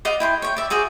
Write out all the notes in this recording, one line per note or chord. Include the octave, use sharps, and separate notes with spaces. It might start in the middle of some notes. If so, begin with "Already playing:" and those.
D5 D#5 F5 F#5
E4 G5 C6
C#5 G5
D5 E5
F#4 G#4 C5 D5